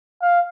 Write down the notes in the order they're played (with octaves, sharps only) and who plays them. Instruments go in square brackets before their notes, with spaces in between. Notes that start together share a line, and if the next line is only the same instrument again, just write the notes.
[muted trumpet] F5